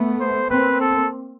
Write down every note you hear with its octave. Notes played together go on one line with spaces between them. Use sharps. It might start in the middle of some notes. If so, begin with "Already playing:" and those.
Already playing: A3 B3
C5
A#3 C4 B4
A4